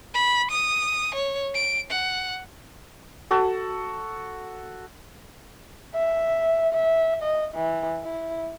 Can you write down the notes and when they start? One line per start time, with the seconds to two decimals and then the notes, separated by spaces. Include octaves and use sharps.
0.14 B5
0.51 D#6
1.14 C#5
1.55 D7
1.91 F#5
3.31 F#4 A4
5.95 E5
6.73 E5
7.23 D#5
7.55 E3
8.03 E4